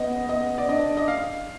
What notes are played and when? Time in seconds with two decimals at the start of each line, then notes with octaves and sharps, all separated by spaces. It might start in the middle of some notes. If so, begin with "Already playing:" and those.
Already playing: B3 D#5
0.29 B3 D#5
0.58 D5
0.69 D4 D#5
0.97 D#5
1.08 F5